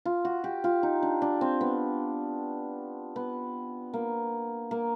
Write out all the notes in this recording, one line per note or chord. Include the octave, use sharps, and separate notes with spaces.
F4
F#4
G4
F4
D#4
D4
D4
C4
B3
B3
A#3
A#3